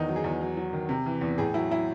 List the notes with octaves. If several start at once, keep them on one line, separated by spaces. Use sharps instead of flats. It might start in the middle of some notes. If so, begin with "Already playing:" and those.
Already playing: E2 D#3 D#4
F#3
G#4
E2
F#3
F#3
D#3
C3
E3
E2
A2 G#4
F#3 E4
F#3 E4